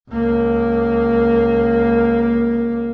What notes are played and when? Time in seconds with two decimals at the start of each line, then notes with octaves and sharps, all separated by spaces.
0.10 C#2 A#3